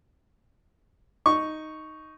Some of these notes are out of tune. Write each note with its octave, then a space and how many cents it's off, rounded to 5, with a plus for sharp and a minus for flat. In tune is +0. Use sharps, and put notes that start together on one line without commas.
D#4 +0 C#6 +0